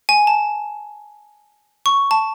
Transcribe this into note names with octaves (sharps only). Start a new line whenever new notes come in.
G#5
A5
C#6
A5